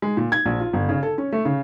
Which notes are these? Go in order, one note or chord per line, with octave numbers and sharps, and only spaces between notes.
G#3
A#2
G#6
A#1
F4
G1
C#3
A4
C#4
A3
C#3